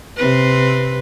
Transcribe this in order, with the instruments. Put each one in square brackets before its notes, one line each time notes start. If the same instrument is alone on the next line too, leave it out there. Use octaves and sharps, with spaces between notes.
[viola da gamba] C3 C4 B4